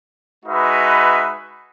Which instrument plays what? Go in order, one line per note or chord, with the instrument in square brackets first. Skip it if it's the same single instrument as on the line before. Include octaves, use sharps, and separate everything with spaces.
[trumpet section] G#3 D#4 F#4 B4 E5